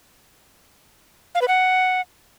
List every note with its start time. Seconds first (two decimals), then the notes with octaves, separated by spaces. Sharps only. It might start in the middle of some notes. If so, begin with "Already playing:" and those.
1.35 F5
1.41 B4
1.48 F#5